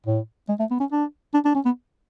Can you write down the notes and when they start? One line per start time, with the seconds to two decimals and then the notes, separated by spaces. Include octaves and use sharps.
0.07 A2
0.49 G#3
0.60 A3
0.71 B3
0.80 C#4
0.92 D4
1.34 D4
1.45 D4
1.55 C#4
1.66 B3